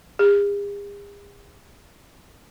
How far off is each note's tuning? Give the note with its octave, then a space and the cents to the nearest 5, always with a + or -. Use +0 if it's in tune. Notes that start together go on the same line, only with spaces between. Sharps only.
G#4 -45